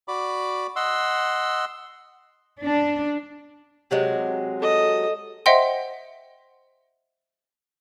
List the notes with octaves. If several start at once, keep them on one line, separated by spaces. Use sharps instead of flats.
F#4 D5 B5 D6
D#5 F#5 C6 E6
D4
C3 F#3 G#3
A4 D#5
C5 D#5 E5 F#5 G5 C6